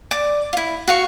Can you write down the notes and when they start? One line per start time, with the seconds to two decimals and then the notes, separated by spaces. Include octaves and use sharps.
0.11 D5 D6
0.53 E4 F4
0.88 F#4 F5 C#6